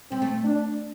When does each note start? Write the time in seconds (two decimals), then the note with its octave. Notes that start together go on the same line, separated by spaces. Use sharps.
0.12 G3 C4
0.22 A3
0.44 D4